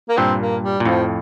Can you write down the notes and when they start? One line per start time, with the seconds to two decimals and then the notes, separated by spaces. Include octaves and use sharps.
0.09 A#3
0.17 G2 A#2 C4
0.40 A#3
0.63 G3
0.80 A#2
0.85 F2 A2 F3